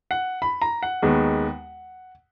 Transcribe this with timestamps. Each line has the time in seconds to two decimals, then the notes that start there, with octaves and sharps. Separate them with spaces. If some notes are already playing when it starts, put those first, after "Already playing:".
0.11 F#5
0.42 B5
0.62 A#5
0.83 F#5
1.02 D#2 D#3 G#3 B3